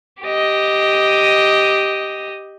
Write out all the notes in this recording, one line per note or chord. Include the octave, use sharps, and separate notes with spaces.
G4 D#5